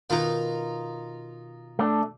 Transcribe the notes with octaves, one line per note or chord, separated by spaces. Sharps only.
B2 D#3 D#4 F4 F5
A3 D4